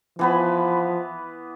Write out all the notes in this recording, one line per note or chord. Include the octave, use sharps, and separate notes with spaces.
E3 F3 B3 B5